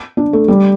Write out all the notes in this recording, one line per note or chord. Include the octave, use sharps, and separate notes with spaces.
D4
A3
G3